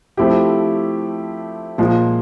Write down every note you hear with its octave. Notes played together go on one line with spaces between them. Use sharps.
F3 A3 C4 E4 G4
A#2 F3 G#3